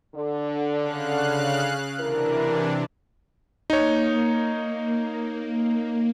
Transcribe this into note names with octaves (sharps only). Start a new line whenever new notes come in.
D3
C#3 F5 F#6
D2 C3 E3 D4 E4 A#4
A#3 D#4 C#5